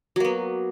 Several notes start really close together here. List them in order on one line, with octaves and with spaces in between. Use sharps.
F#3 A#3 B3